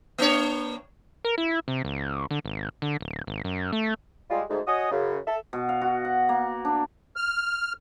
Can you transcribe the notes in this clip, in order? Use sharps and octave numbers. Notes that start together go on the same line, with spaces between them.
A#3 D4 C#5
A#4
E4
C3
C#2
D3
G#1
D3
D1
G#1
F#2
A3
G3 G#3 F4
D2 G#2
F#4 C#5 D#5 G#5 D#6
F#2 C#3
A4 E5
B2
F5
F#4
F#5
A#3
D4
F6